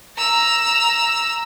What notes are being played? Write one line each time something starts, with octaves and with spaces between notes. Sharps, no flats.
A#5 E6